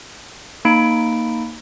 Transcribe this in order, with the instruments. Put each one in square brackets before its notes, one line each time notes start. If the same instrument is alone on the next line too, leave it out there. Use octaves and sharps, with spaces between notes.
[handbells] A#3 D#4 B5 D7